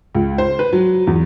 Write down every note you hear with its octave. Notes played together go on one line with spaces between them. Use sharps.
C#2
C5
B4
F#3
E2